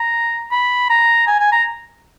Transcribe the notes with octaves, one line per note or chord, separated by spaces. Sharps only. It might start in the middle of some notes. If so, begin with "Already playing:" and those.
Already playing: A#5
B5
A#5
G#5
G#5
A#5